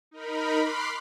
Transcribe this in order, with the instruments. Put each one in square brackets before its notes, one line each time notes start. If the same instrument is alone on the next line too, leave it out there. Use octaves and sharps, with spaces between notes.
[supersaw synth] D#4 A#4 B5
B5 C6 D6 F6 F#6 C7